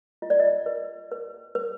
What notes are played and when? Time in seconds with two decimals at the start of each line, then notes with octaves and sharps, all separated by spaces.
0.22 F4 D#5
0.30 D5
0.40 D#5
0.66 B4
1.12 B4
1.55 B4